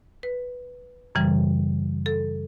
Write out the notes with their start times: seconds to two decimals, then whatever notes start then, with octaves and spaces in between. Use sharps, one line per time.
0.23 B4
1.15 F#2 C#3 E3 G3
2.06 A4